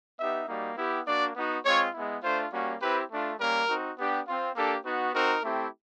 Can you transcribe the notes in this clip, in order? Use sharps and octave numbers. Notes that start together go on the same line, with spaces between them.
B3 D#4 G4 E5
G3 A#3 D#4 F#4
B3 E4 G4
A#3 D4 F#4 D5
B3 D#4 F#4
G#3 C4 F4 C#5
G#3 B3 E4
A3 D4 F4 C5
G3 A#3 C#4 F#4
C4 E4 G4 B4
A3 D4 F4
G3 A#3 C#4 A#4
C4 D#4 F#4
B3 D4 G4
C4 F4
A#3 D4 G4 A4
B3 D#4 F#4
C4 D#4 F#4 A#4
A3 C4 E4 G4